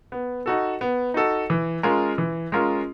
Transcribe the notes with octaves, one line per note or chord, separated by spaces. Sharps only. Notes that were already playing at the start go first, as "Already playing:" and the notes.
B3
D#4 F#4 A4
B3
D#4 F#4 A4
E3
G#3 C#4 F4 A#4
E3
G#3 C#4 F4 A#4